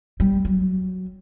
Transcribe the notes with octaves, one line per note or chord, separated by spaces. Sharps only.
G3
F#3